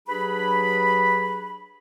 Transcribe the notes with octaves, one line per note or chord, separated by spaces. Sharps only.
F#3 D4 G4 G#4 B4 B5